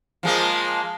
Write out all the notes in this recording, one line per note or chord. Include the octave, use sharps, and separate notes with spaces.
F3 G#3 A#3